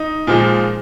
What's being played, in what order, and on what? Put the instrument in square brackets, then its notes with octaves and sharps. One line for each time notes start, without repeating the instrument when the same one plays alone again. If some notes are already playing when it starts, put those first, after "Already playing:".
Already playing: [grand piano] D#4
A#2 F3 G#3